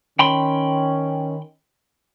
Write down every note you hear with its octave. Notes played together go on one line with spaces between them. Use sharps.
D#3 C#4 G5 B5 C6